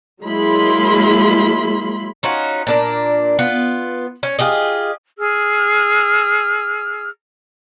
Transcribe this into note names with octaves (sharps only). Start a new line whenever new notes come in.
F#3 G#3 A#3 E4 B5 C6
C#4 D#4 F4 F#4
A#2 D4 A#4
B3 F4
C#4
F4 G4 G#4 D#5
G#4 E6 F6